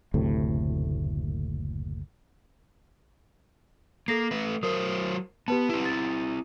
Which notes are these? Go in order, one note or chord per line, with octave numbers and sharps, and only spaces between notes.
F#1 D2 A2 C3
A#3 A4 A#6 C7
A3 B4
F#3 A#4 C5 D#6
B3 G4 B4 A5
C4 E4
A6